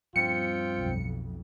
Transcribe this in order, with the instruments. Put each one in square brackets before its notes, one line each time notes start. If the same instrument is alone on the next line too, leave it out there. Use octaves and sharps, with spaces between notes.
[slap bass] G2 F3 G3 [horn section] C4 F4 G5 [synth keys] C#7
[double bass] B1 F2